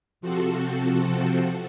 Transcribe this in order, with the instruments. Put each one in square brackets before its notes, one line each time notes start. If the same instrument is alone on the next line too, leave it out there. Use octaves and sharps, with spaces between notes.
[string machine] C3 F3 C4 F#4 A4